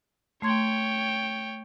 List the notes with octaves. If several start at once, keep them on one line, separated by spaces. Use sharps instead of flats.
A3 C#5 G5 C6 G#6